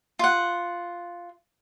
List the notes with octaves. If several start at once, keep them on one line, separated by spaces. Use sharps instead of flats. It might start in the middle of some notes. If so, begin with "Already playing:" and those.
F4 F#5